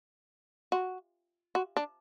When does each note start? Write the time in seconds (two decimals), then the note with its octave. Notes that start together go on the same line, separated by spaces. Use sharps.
0.72 F#4
1.55 F#4
1.77 D4